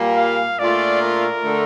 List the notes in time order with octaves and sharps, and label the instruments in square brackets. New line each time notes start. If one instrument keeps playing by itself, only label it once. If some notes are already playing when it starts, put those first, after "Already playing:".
Already playing: [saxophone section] A#2 G3 A#3
[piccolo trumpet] F5
[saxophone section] A#2 A3 D4 F4 [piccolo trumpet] D5
[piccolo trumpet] A#4
[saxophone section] D3 A3